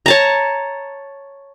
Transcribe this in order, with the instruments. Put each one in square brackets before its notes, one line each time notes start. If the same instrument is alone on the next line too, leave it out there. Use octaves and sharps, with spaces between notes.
[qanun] C#5 A5 A#5